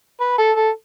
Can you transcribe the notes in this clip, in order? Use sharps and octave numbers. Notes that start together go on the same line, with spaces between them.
B4
A4
A4